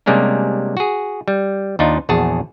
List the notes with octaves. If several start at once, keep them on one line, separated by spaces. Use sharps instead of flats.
C3 G3 G#3 A#3 C#4 D4
F#4 G#4
G3
D#2 D4 D#4 F4
A#1 E2 F#4 G#4 A5